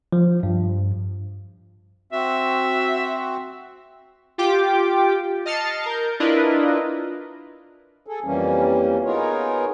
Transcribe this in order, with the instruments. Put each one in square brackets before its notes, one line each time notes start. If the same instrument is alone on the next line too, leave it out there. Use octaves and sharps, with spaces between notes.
[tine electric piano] F3
G2
[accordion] C4 F#4 [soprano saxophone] E5
[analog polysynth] F4 G4 G5 D6
D#5 A5 F6 A6 C7 C#7
A#4 G6
D4 E4 F4 A#4 B4 D#5
[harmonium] G#4 A4
F2 E3 G3 A#3 C#4
B3 D#4 F4 G#4 A#4 C#5